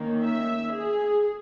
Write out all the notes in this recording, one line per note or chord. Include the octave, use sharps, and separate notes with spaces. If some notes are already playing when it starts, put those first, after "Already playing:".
Already playing: D#3 A#3 C#4
E5
G#4